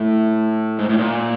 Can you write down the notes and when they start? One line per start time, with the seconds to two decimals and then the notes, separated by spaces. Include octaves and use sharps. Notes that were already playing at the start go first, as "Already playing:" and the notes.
Already playing: A2
0.79 G#2
0.89 A2
0.98 A#2